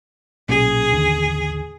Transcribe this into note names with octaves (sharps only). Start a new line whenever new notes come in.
B1 A#2 C#4 G#4
A1 D#2 D3